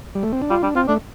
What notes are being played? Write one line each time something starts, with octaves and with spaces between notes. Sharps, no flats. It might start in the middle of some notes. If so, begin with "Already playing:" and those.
G3
A3
C4
D4
G3 F4
G3 D4
C4 F4
A3 D4